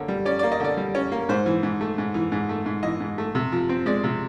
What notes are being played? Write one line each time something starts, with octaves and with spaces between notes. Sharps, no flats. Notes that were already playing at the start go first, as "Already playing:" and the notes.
Already playing: D3 A#3 C#5
G3
C#4 D5
A#3 D5
D#5
D3 D5
G3
C#4
A#3
G#2 C5
E3
G#2
A3
G#2
E3
G#2
A3
G#2
E3 D#5
G#2
A3
C3
F3
C4
G#3 D5
C3